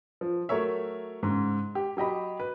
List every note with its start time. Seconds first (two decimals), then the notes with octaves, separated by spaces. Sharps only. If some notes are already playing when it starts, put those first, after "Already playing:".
0.21 F3
0.49 F#3 A3 A#4 C#5 E5
1.23 G#2 C#3
1.75 G4
1.97 F#3 G4 D#5 B5
2.40 B4